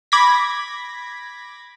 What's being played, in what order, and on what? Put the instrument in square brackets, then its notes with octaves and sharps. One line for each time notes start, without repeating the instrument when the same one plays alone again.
[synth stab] B5 D6 G#6 A#6 B6